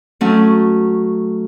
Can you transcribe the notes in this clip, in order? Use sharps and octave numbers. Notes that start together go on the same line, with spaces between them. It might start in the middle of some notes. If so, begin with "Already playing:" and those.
F#3 A3 C#4